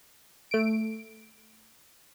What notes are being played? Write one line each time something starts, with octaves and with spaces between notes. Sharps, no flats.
A3 D7